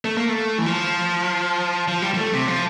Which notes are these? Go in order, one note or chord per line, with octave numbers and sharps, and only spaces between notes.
A3
A#3
A3
E3
F3
F3
G3
G3
A3
C3
F3